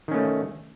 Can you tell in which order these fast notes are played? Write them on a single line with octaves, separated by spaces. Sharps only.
D#3 C#4 A3